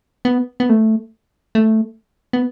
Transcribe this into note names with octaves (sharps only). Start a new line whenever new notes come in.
B3
B3
A3
A3
B3